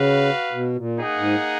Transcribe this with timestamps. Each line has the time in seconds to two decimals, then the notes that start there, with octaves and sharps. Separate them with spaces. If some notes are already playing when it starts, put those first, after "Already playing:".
Already playing: C#3 F#4 B4 F5
0.52 B2
0.76 A#2
0.99 A#3 D#4 G#4 D#5 F#5
1.17 G#2